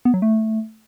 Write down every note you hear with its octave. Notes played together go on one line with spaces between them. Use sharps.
B3
F#3
A3